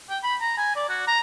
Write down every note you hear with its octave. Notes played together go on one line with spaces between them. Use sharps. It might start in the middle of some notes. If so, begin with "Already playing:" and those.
G5
B5
A#5
G#5
D5
F#4
A#5